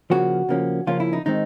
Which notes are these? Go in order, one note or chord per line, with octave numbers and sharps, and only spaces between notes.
C#3 F3 A#3 C#4 F#4
C#3 F3 A#3 C#4
C#3 F3 A#3 C#4 F4
E4
D#4
D#3 G#3 C4 D#4